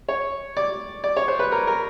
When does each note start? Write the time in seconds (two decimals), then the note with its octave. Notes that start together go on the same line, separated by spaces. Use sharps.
0.09 C#5
0.57 D5
1.04 D5
1.17 C#5
1.28 C5
1.39 B4
1.52 A#4
1.67 A#4